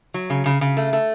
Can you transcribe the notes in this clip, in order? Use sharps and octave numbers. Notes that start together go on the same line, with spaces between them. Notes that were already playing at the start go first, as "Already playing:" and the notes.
F#3
C#3
C#3
C#3
A3
A3